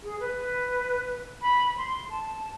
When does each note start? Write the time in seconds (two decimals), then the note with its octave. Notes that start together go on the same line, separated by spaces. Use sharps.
0.03 G#4
0.20 B4
1.42 B5
1.77 C6
2.10 A5